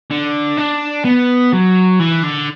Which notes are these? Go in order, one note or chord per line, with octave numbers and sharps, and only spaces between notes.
D3
D4
B3
F#3
E3
D3